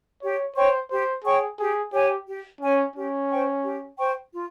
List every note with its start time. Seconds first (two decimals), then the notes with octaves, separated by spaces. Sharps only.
0.22 G4 C#5
0.56 C5 C#5 G5 C#6
0.90 G4 C5
1.24 G#4 C#5 G5 C#6
1.58 G4 G#4
1.93 G4 C#5 G#5
2.27 G4
2.61 C#4 C#5 G#5
2.95 C#4 G4
3.30 C5 G5 C#6
3.64 G4
3.98 C5 G5 C#6
4.32 F4